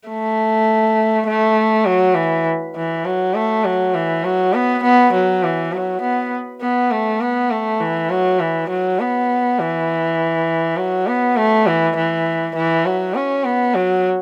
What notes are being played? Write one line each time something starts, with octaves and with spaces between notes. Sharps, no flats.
A3
A3
F#3
E3
E3
F#3
A3
F#3
E3
F#3
B3
B3
F#3
E3
F#3
B3
B3
A3
B3
A3
E3
F#3
E3
F#3
B3
E3
F#3
B3
A3
E3
E3
E3
F#3
C#4
B3
F#3